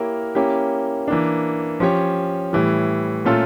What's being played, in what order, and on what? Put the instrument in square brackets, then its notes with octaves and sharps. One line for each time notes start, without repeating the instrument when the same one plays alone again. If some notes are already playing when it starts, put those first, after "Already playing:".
Already playing: [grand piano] A#3 E4 G4 A#4 C#5
A#3 C#4 E4 G4
E3 A#3 D4
F3 C#4 G4 C#5
A2 E3 G3
A#2 A3 C#4 F4 A4